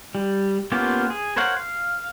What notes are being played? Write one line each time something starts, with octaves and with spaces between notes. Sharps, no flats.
G3
A#3 B3 C#4 F4 G4
G#4
A#4 C5 C#5 F5 F#5
F5